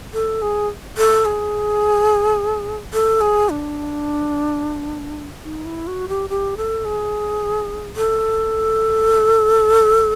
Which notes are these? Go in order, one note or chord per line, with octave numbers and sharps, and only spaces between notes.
A4
G#4
A4
G#4
A4
G#4
D4
D#4
E4
F#4
G4
G4
A4
G#4
A4